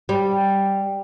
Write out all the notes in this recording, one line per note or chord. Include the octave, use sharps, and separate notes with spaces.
G3